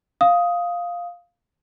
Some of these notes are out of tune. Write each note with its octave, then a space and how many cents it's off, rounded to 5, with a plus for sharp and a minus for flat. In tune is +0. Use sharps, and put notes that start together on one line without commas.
F5 +0 D#6 +10